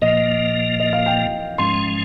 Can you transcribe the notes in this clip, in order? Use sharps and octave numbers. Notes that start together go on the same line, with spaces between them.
A#2 F3 A#3 D#5
D#5
F5
G5
G#2 F3 G#3 C#4 C6